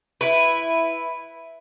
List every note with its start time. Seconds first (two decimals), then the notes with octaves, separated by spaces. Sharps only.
0.21 E4 B4